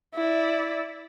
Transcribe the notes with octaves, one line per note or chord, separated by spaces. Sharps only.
E4 D5